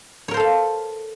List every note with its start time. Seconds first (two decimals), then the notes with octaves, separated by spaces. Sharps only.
0.28 C#5
0.31 A#4
0.34 C5
0.37 A4
0.40 F5